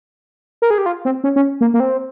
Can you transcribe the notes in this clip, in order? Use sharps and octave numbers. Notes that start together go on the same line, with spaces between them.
A#4
G#4
G4
F4
C4
C#4
C#4
A#3
A#3
C4